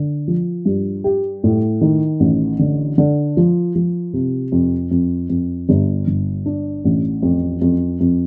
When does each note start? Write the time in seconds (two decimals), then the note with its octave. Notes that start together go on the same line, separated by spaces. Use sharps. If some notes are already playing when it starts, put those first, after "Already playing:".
Already playing: D3
0.28 F3
0.65 G2
1.04 G4
1.44 A2
1.81 D#3
2.20 A1
2.59 D3
2.98 D3
3.37 F3
3.75 F3
4.13 C3
4.52 F2
4.91 F2
5.29 F2
5.69 G1
6.07 G1
6.46 D4
6.85 A1
7.23 F2
7.61 F2
8.00 F2